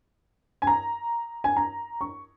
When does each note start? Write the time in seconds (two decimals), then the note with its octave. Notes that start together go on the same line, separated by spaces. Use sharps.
0.62 G#5
0.67 A#5
1.44 G#5
1.57 A#5
2.01 C#6